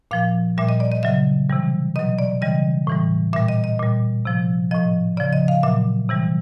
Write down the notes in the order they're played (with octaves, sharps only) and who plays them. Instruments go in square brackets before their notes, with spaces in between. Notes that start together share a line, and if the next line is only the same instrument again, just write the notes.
[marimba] A#2 F3 F5
A#2 G3 E5
D#5
D5
D#5
C#3 F#3 E5
C3 E3 G3
B2 F#3 D#5
D5
C#3 E3 G3 D#5
A2 E3 G3
A#2 G3 E5
D#5
D#5
A#2 G3
C3 F3
A2 F3 D#5
C#3 F3 D5
D#5
F5
A#2 F#3 E5
C3 E3 G3